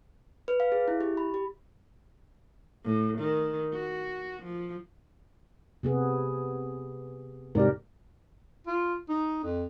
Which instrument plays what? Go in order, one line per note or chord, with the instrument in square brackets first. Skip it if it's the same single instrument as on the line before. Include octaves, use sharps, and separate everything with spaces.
[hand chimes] B4
F5
G#4
E4
G4
B5
G4
[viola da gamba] A2
D#3
F#4
F3
[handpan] C3 B3 G#4
[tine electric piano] G#2 C3 D5 [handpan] G4 A#4
[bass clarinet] F4
D#4
F2